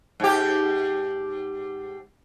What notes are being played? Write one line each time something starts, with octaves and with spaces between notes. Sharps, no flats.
G#2 G4